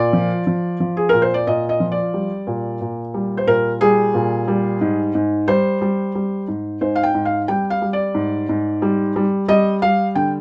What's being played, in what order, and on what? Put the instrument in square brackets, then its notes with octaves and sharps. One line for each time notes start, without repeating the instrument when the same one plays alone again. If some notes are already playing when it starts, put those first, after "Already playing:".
Already playing: [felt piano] A#2 D5
F3
F3
F3
G#4
A#2 A#4
C5
D5
A#2 D#5
D#5
F3
D5
G3
A#2
A#2
G3
C5
A#2 A#4
G3 G#4
A#2
G3
G#2
G#2
G3 C5
G3
G3
G#2
G#2 C5
F5
G5
G#2
F5
G3 G5
F5
G3
D5
G#2
G#2
G3
G3
G3 D#5
G3 F5
D3 G5